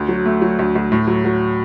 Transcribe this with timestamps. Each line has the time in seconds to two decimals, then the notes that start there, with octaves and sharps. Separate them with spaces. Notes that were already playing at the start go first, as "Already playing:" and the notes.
Already playing: D2
0.09 F#3
0.26 A3
0.42 F#3
0.59 D2
0.75 D2
0.92 A2
1.07 F#3
1.24 F#3